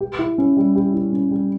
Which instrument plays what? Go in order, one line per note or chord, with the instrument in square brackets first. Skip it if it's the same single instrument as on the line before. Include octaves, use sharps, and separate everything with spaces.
[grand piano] G4
E4
C#4
G3
G4
E4
C#4
G3